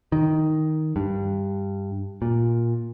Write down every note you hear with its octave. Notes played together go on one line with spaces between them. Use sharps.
D#3
G2
A#2